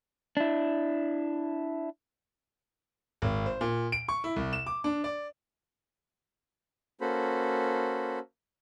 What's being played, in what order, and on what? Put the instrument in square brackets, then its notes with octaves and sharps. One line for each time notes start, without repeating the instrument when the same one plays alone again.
[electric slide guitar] D4 E4
[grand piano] G#1
C5
A#2
D7
C#6
E4
C2
E7
D6
D4
D5
[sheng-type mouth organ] A#3 C#4 F#4 A4 C5 B5